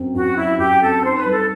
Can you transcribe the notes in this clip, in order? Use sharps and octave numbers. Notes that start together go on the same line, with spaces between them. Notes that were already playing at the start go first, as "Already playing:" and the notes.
Already playing: F#2 C4
F#2 F#4
F#3 E4
F#2 G4
C4 A4
D#4 C5
B4
G3 A4